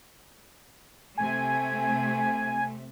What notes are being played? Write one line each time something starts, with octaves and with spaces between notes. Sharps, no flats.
C3 A3 G#5